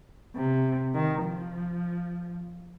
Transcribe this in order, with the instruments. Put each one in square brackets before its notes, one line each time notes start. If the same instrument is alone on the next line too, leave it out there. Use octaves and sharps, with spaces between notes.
[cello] C3
D#3
F3